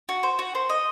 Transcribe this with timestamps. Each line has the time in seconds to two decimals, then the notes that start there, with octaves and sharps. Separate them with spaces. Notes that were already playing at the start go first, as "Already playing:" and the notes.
0.09 F#4
0.23 C5
0.39 F#4
0.55 C5
0.69 D#5